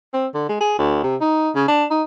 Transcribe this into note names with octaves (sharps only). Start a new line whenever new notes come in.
C4
D3
G#3
G#4
D2
C3
D#4
C#3
D4
D#4